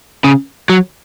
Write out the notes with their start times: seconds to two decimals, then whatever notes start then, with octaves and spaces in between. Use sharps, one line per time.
0.24 C#3
0.70 F#3